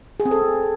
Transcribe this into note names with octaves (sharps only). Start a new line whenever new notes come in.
G#4
C4
A4